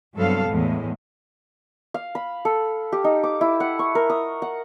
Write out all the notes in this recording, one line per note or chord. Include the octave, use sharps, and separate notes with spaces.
G2 C3 F#3 B3 A4 F5
E2 A2 G#3
F5
B5
A4
G4
D#4
D6
E4
F#5
C#6
A#4
D#6
F#5